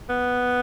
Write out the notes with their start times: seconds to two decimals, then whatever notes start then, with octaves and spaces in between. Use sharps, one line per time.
0.10 B3